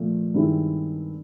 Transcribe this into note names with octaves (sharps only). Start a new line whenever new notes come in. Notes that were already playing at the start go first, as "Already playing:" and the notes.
Already playing: A#2 F3 A3
G2 D#3 G#3 C4 E4